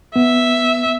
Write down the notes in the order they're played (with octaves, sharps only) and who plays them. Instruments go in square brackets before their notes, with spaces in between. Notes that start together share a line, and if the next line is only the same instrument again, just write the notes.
[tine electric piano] B3 [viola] E5